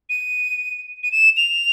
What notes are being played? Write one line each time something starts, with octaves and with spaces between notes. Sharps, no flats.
D#7
D#7
E7
F7